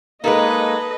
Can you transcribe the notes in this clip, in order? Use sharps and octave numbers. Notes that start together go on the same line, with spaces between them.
G#3 A#3 D#4 A4 B4 D#5